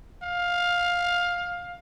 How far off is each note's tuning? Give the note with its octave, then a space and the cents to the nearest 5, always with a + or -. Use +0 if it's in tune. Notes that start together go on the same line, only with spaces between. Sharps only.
F5 +15